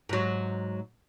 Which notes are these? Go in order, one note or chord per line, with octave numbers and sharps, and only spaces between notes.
G#2 F#3